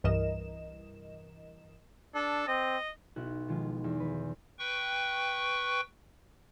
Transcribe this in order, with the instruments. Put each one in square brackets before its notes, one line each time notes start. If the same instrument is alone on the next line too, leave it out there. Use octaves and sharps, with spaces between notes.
[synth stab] C2 G2 E3 A#4 D#5 E7
[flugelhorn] D4 [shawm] A4
[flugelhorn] C4 [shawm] D#5
[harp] B1 E4 F#4 F#6
B2 D#3 F3 G#3 F4
E2
B4
[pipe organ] B4 G5 C#6